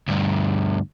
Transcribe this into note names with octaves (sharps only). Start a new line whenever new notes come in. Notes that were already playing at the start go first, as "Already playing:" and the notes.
D2 G2